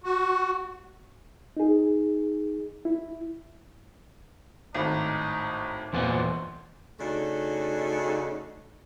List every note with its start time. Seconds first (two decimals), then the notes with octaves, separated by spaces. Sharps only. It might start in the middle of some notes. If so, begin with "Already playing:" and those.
0.04 F#4
1.57 D#4 G#4
2.85 E4
4.75 G#1 A2 D#4
5.93 E2 A#2 B3 C5
7.00 C#3 A3 D4 D#4 F#4